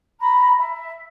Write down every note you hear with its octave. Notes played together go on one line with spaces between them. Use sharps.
A#5 B5
E5